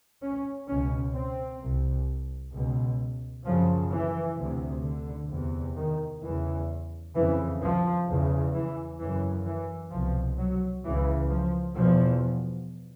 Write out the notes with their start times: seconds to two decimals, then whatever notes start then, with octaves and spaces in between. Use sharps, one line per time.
0.22 C#4
0.68 C#2 B2 C#4
1.14 C4
1.61 C2 C3
2.53 C#2 B2
3.45 F#2 C#3 F3
3.91 E3
4.38 D2 C3
4.83 D3
5.30 E2 C3
5.77 D#3
6.22 E2 C#3 E3
7.14 F2 C#3 E3
7.61 F3
8.07 E2 C#3
8.53 E3
8.99 F#2 C#3 E3
9.45 E3
9.91 C2 B2 F3
10.38 F#3
10.84 C#2 C#3 E3
11.31 F3
11.76 E2 B2 F3